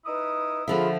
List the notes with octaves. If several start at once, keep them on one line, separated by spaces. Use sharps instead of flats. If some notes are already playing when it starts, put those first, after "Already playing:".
D#4 E4 B4 D#6
D3 F3 F4 G#4 E5 B5